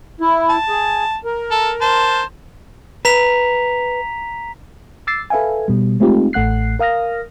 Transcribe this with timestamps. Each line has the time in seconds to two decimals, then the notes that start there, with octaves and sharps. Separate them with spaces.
0.21 E4
0.50 A5
0.69 G#4
1.25 A#4
1.51 A4
1.81 C5 A5
3.05 B4 A#5 B6 F7
5.07 D6 E6 A6 C7
5.30 A4 B4 E5 F5 G#5
5.68 B2 G3
6.00 G#3 A3 C4 D#4 F4 G4
6.33 A1 A3 F#5 F#6 C7
6.79 A#4 F5 D#6 F6 A#6